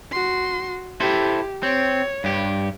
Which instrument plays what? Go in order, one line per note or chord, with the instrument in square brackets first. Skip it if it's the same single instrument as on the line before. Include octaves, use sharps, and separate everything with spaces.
[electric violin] F#4 C6
[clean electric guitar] E4 A4 C5 [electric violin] G4
[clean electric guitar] C4 [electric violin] C#5
[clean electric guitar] G2 G4